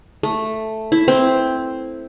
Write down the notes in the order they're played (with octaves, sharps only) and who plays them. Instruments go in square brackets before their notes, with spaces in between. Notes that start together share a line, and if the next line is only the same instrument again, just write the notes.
[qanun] A3
E4
C4